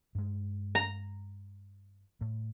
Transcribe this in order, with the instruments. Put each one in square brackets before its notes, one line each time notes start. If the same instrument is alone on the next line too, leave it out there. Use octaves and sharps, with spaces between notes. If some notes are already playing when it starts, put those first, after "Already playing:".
[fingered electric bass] G2 G#3
[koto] A#5
[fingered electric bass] A2